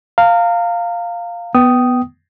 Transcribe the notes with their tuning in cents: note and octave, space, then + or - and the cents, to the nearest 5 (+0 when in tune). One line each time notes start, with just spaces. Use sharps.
F5 +0 A#5 -35
B3 +0 G5 -20 D#6 +0